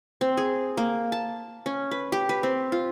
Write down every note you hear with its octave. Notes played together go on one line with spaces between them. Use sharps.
C4
G#4
A#3
A5
C#4
B4
G4
B4
C4
F4